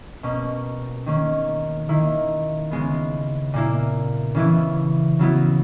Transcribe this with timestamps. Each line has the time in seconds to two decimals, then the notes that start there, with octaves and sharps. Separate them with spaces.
0.23 B2 A#3 C#4
1.06 D#3 A#3 C#4
1.89 D#3 A#3 E4
2.71 C#3 G#3 B3
3.54 A#2 A#3 E4
4.35 C#3 E3 B3 E4
5.19 C#3 F#3 B3 E4